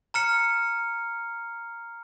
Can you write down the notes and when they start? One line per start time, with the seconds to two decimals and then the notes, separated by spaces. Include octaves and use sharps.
0.14 A#5 F6 C#7